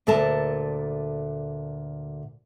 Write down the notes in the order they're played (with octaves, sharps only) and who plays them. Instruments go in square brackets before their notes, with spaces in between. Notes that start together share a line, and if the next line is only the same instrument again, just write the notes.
[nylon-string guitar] D2 A#2 A4 A#4 A5